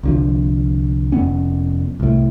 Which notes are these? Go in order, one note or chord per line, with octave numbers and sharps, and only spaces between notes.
C2 D3 F3
F1 F2 B3 C#4
C2 A2